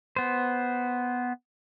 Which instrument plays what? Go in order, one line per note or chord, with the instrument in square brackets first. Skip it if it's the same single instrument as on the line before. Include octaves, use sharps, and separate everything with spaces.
[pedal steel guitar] B3 C5